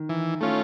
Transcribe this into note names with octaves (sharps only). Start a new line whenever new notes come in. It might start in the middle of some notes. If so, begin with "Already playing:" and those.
Already playing: D#3
E3
A3 C#4 F4